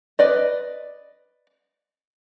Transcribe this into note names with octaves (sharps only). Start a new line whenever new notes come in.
B4 D5 D#5